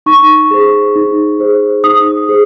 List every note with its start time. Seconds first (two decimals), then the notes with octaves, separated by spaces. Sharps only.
0.06 D#4 C#6
0.51 G#4 C5
0.95 D#4
1.39 G#4 C5
1.84 D#4 D#6
2.29 G#4 C5